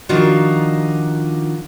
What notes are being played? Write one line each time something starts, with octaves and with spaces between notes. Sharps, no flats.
D#3 F3 D4 D#4 F4 F#4